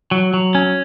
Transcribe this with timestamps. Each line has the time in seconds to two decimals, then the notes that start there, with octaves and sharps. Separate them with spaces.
0.11 F#3
0.34 F#3
0.55 C#4